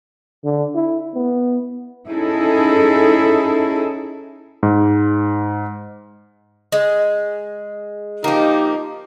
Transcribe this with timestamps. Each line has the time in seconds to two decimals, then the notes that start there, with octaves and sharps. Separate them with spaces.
0.44 D3
0.75 E4
1.15 B3
2.08 C#4 D#4 E4 G#4 A4
4.63 G#2
6.72 G#3
8.24 F3 A#3 D#4 G4 D#5